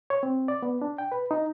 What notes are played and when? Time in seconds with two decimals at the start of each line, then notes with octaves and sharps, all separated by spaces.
0.10 C#5
0.23 C4
0.48 D5
0.63 B3
0.82 D4
0.98 G5
1.12 B4
1.31 D#4